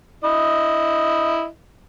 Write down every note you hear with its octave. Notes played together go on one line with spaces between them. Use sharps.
E4 D#5